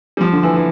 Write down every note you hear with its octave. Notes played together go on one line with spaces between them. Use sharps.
G3
F3
D3
E3
E3